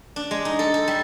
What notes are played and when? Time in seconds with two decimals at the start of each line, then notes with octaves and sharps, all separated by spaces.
0.16 D4
0.31 G#3
0.45 D#4
0.59 A4
0.74 A4
0.88 G3